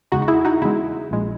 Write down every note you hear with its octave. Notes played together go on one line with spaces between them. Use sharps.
E2 C#3 G#3 D#4 F#4
F#4
E4 G#4
D#4 F#4
E2 C#3 G#3 E4
A#1 A#2 G#3